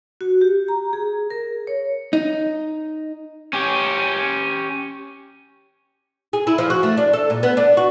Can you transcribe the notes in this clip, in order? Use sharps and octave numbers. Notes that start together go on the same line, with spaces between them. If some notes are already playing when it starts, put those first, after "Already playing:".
F#4
G4
A#5
G#4
A#4
C#5
D#4
C#4 G4
G#4
E4
F3
F#4
A3
D4
A4
A#2
B3
D4
F#4